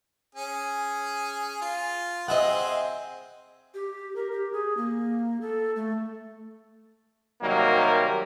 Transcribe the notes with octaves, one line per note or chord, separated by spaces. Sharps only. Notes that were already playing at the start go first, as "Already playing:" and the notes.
C#4 G#4
F4
C4 G#4 D#5 E5 F#5
G4
A#4
G4
G#4
A#3
A4
A3
C3 D#3 F#3 G3 A#3